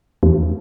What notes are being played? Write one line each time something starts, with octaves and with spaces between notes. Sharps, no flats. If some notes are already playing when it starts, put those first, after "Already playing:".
E2